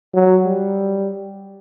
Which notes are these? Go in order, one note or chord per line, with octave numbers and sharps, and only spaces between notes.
F#3
G3